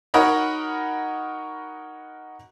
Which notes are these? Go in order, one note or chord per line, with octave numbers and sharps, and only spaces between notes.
D#4 F#4 A#4 C#5 D#5 B5